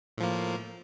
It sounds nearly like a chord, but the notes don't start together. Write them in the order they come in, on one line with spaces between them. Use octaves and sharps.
A2 F3 A#3